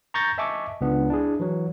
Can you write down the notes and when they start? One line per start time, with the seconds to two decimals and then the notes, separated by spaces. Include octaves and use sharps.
0.14 A#5 C#6 G6 A6 A#6
0.38 D#5 E5 G#5 A5 C#6 D6
0.81 C#2 B3 D4
1.10 D4 E4 G#4
1.40 E3 F#3